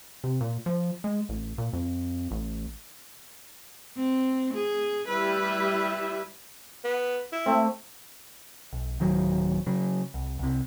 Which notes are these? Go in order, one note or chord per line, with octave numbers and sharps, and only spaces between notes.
C3
A#2
F3
G#3
A1
A#2
F2
A1
C4
G#4
G3 E4 B4 E5
B3
E4
A3 C4
B1
D1 D#3 F#3
C#3 F#3
C2
C2 C3